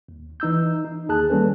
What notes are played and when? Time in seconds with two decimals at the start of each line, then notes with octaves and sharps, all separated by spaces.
0.08 D#2
0.40 E3 D#4 E6 G6
0.85 D#4
1.09 D#2 G#4 A5 F#6
1.30 D#3 G3 A#3 C#4 A4 B4